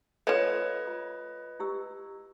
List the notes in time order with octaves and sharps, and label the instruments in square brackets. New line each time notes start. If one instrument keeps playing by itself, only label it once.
[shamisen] F3 A3 [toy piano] A4 C#5 [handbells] B4 D#5 G#6
[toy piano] F4
E4 G4 E6